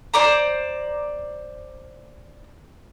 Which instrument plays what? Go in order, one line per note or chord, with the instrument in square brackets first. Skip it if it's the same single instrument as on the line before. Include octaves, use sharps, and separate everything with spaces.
[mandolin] C5 D5 A#5